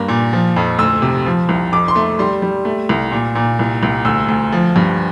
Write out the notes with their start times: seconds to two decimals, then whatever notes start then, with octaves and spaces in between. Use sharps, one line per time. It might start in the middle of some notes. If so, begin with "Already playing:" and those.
Already playing: G2 A#3
0.09 A#2
0.33 F3
0.56 F2
0.78 D2 E6
1.02 C3
1.26 F3
1.49 C2
1.72 F2 D6
1.88 C6
1.96 A3
2.19 G3 C6
2.42 G3
2.65 A3
2.89 C2
3.12 A#2
3.35 A#2
3.59 C2
3.83 C2
4.05 D2 E6
4.28 D2
4.52 F3
4.76 G2